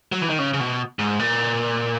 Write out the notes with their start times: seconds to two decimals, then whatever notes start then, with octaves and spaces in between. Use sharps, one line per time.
0.12 F#3
0.21 E3
0.30 D#3
0.39 C#3
0.54 C#3
0.60 B2
0.99 G#2
1.19 A#2